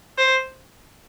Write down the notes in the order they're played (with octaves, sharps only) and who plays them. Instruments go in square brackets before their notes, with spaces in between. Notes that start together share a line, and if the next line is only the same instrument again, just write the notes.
[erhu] C5